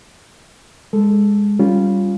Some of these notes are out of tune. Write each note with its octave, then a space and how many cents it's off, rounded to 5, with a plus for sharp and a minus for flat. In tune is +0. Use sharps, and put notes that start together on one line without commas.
G#3 -15 A4 +0
G3 +0 C#4 +5 F4 +0